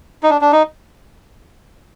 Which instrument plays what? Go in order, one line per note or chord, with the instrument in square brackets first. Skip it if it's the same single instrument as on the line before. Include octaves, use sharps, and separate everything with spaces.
[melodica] D#4
D4
D4
D#4